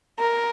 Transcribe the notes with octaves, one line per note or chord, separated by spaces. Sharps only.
A#4